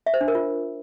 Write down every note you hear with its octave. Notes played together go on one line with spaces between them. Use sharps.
E5
C5
D4
A#4
F4